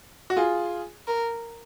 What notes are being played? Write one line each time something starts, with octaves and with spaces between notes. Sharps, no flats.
F#4
F4 G#4
A#4